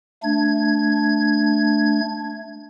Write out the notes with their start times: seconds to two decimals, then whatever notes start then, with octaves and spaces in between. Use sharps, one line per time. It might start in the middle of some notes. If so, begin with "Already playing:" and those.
0.23 A3 D4 G#6